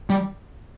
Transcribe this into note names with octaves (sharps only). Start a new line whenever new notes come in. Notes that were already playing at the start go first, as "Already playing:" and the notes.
G3